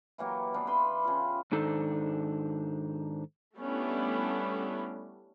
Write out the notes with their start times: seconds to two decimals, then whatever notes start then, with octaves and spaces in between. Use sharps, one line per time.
0.18 E3 F#3 A#3 G4
0.54 E3 B3 D4 F5
0.67 B4 B5 C6
1.04 C#3 F4
1.52 G#2 D#3 D4 D#4 A4 C5
3.57 G3 A3 B3 C#4 D4 E4